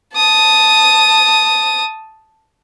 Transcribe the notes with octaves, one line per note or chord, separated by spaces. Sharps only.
A5 D#6